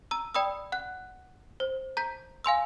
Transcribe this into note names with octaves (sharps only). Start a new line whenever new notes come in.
A#5 E6
D5 G5 B5 D#6 E6
F#5 F#6
C5
A#5 G6 B6
F5 G#5 C6 E6